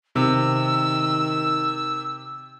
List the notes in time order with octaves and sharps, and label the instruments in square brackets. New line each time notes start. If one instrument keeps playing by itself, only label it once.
[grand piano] C3 [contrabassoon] D#3 [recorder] E6